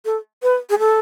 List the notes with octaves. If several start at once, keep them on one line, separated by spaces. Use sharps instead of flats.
A4
B4
G#4
A4